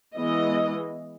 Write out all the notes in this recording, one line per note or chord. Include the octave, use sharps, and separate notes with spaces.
E3 G#3 B3 D#5